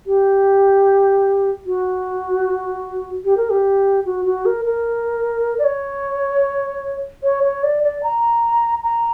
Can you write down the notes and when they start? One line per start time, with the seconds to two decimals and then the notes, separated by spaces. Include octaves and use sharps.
0.07 G4
1.66 F#4
3.25 G4
3.37 A#4
3.50 G4
4.05 F#4
4.25 F#4
4.45 A#4
4.65 A#4
5.59 D5
5.64 C#5
7.23 C#5
7.44 C#5
7.63 D5
7.83 D5
8.03 A#5
8.83 A#5